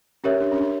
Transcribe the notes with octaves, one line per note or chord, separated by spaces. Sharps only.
C#4 G4 A#4 C#5 E5
D4
C#4
D4